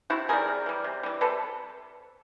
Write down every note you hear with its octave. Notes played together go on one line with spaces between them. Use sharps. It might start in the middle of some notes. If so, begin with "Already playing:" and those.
C3 E4 F#4
E3 G3 G#4 A#4
C3
E3 G3
C3
E3 G3
C3 A4 B4